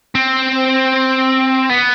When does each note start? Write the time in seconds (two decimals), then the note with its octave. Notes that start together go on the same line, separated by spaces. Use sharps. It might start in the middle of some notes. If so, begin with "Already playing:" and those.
0.15 C4
1.70 B3